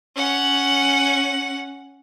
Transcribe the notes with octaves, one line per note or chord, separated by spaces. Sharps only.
C#4 F#5